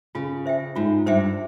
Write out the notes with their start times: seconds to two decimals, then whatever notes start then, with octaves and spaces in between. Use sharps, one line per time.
0.15 C#3 F4
0.46 C5 E5 G5
0.76 G#2 F4
1.06 G2 C5 E5 G5